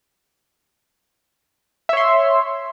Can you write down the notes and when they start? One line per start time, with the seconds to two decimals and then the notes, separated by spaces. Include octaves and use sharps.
1.89 E5
1.93 C#5
1.97 C6